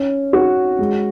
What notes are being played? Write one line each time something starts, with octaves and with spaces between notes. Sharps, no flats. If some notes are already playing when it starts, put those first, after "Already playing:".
Already playing: C#4
F#4
G#3